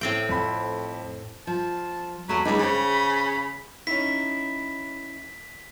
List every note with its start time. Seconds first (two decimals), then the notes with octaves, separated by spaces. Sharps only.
0.01 A2 C4 G5
0.29 F2 B5
1.47 F3 A5
2.29 E2 F#3 A3 B5
2.45 C#2 G#3 D#4
2.59 C#3 C5 G5
3.87 C#4 D#4 E4 B6